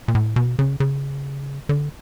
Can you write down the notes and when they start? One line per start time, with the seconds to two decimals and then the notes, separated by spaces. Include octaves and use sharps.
0.08 A#2
0.15 A2
0.36 B2
0.59 C#3
0.80 C#3
1.69 D3